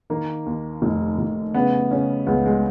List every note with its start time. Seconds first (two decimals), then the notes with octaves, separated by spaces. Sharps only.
0.10 D#3 A#3
0.46 D#2
0.82 F1
1.18 F1
1.54 C#3 B3
1.91 C#3 C#4
2.27 C#2 B3
2.46 G#3